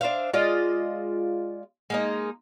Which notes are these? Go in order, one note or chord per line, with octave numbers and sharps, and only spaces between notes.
D4 C5 E5 F5
G#3 F4 D5 D#5
G#3 A#3 D#4